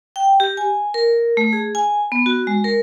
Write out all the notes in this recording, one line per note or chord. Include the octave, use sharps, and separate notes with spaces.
G5
G4
G#5
A#4
A3
G#4
G#5
B3
F#4
G#3
A#4